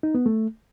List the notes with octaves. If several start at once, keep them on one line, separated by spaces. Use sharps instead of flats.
D#4
B3
A3